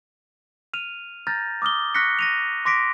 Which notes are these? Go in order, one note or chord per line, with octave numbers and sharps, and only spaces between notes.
F6 D#7 F7
A#5 F6 G6 A6 A#6
D6 D#6 F6 G7
C#6 F6 F#6 A#6 B6 C#7
A#6 D#7 F7
C6 D6 A#6 B6 D7